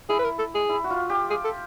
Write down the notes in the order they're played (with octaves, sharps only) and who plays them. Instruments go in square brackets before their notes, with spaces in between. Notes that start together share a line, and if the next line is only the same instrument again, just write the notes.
[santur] E4 [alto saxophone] G#4
[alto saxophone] B4
A#4
A4
G#4
[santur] E4
F#4
F4
G4
[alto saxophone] G#4
A4